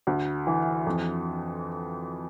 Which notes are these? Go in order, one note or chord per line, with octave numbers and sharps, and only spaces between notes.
D2
E3
F2